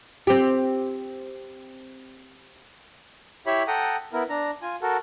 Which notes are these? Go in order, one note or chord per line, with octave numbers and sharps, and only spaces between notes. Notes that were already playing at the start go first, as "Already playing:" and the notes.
C4 G4
E4 G4 C#5 E5 B5
A4 F#5 G5 A#5 D#6
B3 E4 A#4
D4 A#5
F4 G#5
F#4 A4 A#4